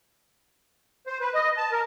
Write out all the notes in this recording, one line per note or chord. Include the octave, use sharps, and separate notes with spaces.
C5
B4
D#5
A5
A#4